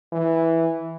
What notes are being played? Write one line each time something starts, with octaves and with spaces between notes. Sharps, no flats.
E3